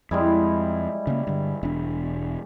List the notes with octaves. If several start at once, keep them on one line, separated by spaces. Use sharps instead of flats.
F2 G3 G#3 E4
C#3 A#3
G2 D3
E1 D4